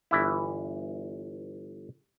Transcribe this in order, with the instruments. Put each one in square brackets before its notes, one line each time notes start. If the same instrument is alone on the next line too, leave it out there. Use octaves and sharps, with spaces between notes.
[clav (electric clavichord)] G1 E3 E4